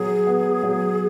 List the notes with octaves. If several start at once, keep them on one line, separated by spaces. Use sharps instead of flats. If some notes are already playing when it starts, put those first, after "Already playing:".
Already playing: F#3 B3 G#4
B3
F#3